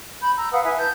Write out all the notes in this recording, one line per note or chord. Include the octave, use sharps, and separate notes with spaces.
B5 G6
A#5 E6
B4 F5 F#5 D#6
E4 B4 E5 G#5
A5 G6